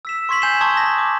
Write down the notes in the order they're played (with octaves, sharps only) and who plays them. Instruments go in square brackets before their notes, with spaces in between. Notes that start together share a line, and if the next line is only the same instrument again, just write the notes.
[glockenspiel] E6 B6 E7
C6 C#6 G#6 B6 F#7
G#5 G6 G#6 C7 E7 G7
A5 C6 C#6 D#6 G6 G#6
A#6
D6